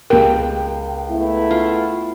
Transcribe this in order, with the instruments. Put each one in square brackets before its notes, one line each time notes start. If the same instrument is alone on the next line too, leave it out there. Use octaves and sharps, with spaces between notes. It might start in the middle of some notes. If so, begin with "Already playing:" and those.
[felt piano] C#2 G4 [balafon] A#4 [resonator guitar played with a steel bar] G5
[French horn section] A3 B3 E4
[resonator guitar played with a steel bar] F4